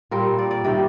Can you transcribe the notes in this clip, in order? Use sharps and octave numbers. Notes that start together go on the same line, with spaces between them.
A#2 G3 C4 A#4
D5
D5
C3 D#3 G3 D5